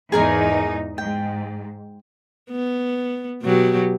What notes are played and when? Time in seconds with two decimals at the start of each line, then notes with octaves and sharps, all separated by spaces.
0.12 E2 G#2 D#4 G#4 A#4 G#5
0.98 G#2 G5
2.51 B3
3.43 B2 F#3 G4